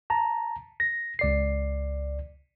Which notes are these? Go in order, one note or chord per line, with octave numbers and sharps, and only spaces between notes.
A5 A#5
A#6
C#2 D5 C7